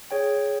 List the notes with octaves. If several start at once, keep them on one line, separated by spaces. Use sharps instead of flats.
G#4 C#5 G5